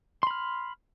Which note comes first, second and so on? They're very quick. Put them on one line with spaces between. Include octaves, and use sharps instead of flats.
C6 B5 F6